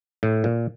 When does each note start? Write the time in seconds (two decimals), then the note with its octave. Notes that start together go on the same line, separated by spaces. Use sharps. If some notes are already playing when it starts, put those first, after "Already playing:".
0.23 A2
0.44 A#2